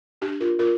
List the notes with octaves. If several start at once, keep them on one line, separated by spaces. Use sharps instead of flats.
D4 G4
F4 A#4
F4 A#4